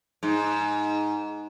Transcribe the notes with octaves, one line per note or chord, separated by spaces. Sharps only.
G#2